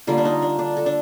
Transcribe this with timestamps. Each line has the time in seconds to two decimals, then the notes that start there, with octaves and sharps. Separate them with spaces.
0.07 D3 G3 A#3 F4
0.18 D4
0.25 D#4
0.42 D4
0.59 D4
0.77 A4
0.86 D4